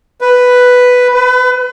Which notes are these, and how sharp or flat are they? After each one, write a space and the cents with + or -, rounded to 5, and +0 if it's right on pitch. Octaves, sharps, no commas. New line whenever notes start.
B4 +5
B4 +35